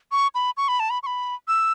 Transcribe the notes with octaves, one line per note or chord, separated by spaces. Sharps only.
C#6
B5
C#6
B5
A5
B5
C#6
B5
E6